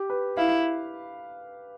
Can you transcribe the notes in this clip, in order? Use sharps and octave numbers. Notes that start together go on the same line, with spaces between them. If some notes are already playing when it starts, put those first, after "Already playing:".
Already playing: G4
B4
E4 F5